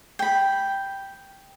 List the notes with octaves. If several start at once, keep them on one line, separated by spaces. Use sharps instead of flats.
G5 B5